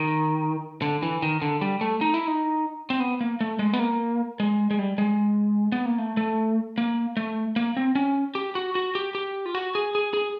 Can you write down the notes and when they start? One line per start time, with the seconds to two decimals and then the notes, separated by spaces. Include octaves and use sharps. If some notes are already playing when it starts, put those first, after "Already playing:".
Already playing: D#3
0.82 D3
1.03 E3
1.22 D#3
1.42 D3
1.61 G3
1.81 A3
2.01 D#4
2.14 E4
2.27 D#4
2.90 C4
3.00 B3
3.21 A#3
3.41 A3
3.59 G#3
3.73 B3
3.79 A#3
4.40 G#3
4.71 G#3
4.79 G3
4.98 G#3
5.72 B3
5.86 A#3
5.98 A3
6.17 A3
6.78 A#3
7.17 A3
7.56 A#3
7.77 C4
7.95 C#4
8.35 G4
8.55 F#4
8.75 F#4
8.95 G4
9.15 G4
9.46 F4
9.55 F#4
9.75 G#4
9.95 G#4
10.14 G#4